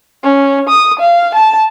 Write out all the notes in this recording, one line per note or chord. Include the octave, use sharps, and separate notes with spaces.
C#4
D#6
F5
A5